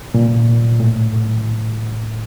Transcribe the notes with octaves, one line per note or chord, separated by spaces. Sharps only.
A#2
A2